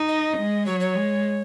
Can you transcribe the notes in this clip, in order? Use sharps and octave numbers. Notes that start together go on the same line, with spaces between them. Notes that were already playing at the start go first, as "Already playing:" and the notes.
Already playing: D#4
D#5
G#3
F#3 C#5
C#5
G#3